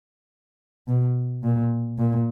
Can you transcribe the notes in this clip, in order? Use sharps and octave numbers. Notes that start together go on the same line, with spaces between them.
B2
A#2
A#2